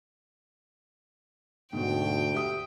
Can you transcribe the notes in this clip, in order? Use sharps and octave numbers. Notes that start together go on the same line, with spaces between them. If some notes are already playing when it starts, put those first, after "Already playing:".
D2 G#2 B2 F#4 G5
G4 E5 D#6